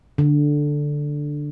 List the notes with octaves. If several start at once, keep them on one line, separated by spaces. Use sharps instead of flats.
D3